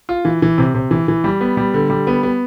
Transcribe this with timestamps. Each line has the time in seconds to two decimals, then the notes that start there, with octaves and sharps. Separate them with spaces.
0.09 F4
0.25 E3
0.42 E3
0.58 C3
0.75 C3
0.91 E3
1.08 E3
1.24 G3
1.41 B3
1.57 G3
1.74 D3
1.90 G3
2.07 B3
2.23 B3